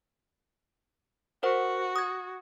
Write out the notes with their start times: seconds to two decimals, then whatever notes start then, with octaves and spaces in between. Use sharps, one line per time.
1.43 F#4 A#4 C5 F#5
1.96 D#6 G#6